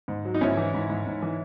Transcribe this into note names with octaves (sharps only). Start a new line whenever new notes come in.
G#2
F#3
D#4
G#2 C#4 E4
E3
G#2
G#2
G#2
E3